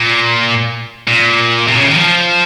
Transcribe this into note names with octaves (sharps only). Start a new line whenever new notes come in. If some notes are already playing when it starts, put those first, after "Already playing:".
Already playing: A#2
A#2
C3
C#3
D#3
F3